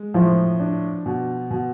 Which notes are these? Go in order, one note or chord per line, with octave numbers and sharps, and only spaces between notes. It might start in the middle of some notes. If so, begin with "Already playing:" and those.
Already playing: G#3
A2 F3
D4
B2
B2